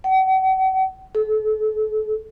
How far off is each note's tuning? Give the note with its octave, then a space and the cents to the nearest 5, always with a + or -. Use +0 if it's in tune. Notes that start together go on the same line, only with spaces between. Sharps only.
F#5 +40
A4 -35